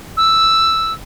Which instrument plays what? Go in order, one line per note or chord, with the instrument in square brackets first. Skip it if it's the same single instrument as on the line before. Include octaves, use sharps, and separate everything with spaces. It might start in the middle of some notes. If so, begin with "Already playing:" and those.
[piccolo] E6